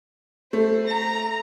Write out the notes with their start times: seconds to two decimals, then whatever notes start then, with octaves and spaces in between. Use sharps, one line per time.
0.53 A3 C5
0.87 A#5